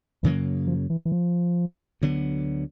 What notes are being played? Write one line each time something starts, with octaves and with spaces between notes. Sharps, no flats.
F#2 C#3 E3 F#3 A#3
F3
E3
E3
F3
D2 D3 F#3 B3